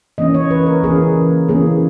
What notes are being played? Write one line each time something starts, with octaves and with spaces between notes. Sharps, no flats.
E3 A#3 C#4 D#5
C#5
B4
A#4
E3 A#3 C#4 G#4
E3 A#3 C#4 G#4